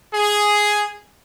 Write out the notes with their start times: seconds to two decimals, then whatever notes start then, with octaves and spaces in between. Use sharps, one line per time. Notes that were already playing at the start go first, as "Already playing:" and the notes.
0.13 G#4